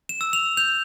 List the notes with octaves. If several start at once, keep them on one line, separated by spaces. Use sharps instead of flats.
E7
E6
F7
G6 F7